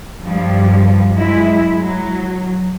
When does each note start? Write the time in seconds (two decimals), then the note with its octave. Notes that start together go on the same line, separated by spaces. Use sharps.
0.22 G2 F3 G3
1.12 F#3 G#3 E4
1.77 F#3